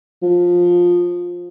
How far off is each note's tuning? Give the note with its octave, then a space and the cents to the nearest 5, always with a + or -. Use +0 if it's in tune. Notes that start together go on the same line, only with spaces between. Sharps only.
F3 +15